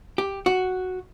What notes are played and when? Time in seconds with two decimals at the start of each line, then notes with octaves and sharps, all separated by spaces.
0.18 G4
0.46 F#4